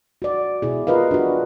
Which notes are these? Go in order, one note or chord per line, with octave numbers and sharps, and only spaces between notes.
F#4 D5
B2 E4 G#4
F4 A#4 B4 D#5 F5
D4 F#4